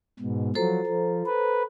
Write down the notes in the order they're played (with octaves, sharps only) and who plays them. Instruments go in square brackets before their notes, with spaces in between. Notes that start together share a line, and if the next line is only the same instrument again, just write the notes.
[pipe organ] G#2 B2
[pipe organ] F3 F#3 [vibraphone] A4 C5 A#5
[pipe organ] F3
B4